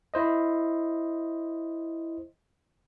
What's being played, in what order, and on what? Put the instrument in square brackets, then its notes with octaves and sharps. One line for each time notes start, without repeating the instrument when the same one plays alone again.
[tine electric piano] E4 C5 D#5